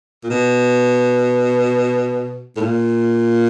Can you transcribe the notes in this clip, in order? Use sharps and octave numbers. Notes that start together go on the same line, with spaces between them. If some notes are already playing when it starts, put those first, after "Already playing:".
A#2
B2
A2
A#2